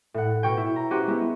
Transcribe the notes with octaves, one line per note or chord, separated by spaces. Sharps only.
A2 F#5
B2 C#5 G5
E4
A#5
C#4 F#4 G4 C5 F#5
G#3 B3 E4